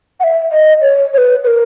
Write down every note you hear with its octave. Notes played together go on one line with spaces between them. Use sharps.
F#5
E5
D#5
C#5
C#5
B4
B4
A#4